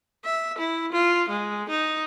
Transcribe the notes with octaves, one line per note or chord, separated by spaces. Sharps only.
E5
E4
F4
G#3
D#4